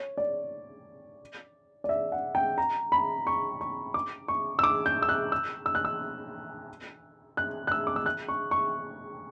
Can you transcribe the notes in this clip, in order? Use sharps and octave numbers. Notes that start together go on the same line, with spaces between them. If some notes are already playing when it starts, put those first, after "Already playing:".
Already playing: C#5
D5
D5
E5
F#5
G5
A#5
B5
C#6
C#6
D6
C#6
E6
D6
G6
E6
F#6
E6
E6
F#6
E6
F#6
F#6
E6
D6
E6
F#6
C#6
C#6